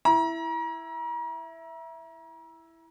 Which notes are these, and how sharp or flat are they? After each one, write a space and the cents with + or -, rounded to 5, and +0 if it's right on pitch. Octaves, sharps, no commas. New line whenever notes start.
E4 +0 A#5 +35